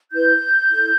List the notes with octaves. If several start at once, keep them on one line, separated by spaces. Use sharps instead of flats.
E4 B4 G6
E4 A4